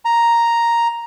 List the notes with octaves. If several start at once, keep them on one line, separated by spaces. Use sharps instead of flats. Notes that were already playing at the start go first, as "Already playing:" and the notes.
A#5